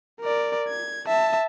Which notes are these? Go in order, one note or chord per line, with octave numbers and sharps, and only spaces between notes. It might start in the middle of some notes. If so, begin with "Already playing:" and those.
A#4 D5
G#6
E5 A5